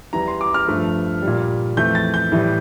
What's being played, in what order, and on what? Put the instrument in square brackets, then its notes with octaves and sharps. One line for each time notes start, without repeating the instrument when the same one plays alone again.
[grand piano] E2 E3 G3 A#5
C6
D6
F6
G2 F3 A3
G3
A#2
F2 E3 A3 G6
A6
G6
A2 E3 G3